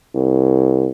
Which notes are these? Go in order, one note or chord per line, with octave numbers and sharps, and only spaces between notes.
C2